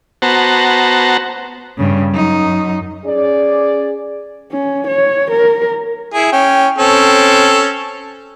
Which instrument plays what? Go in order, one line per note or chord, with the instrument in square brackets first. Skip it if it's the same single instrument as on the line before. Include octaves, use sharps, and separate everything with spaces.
[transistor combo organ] B3 F#4 C5 A5 A#5
[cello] G2 C#3
F#2 D#4
[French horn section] C#4 G#4 D5
[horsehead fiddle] C#4
C#5
A#4
[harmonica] E4 G#4
C#4 G5
C4 C#4 A4